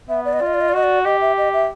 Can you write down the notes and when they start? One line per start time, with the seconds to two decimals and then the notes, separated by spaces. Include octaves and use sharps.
0.09 B3 E5
0.25 D5
0.33 D#5
0.40 F4 D5
0.47 D#5
0.54 D5
0.61 D#5
0.69 D5
0.74 F#4 D#5
0.83 D5
1.05 G4 D#5
1.21 E5
1.38 D#5
1.53 E5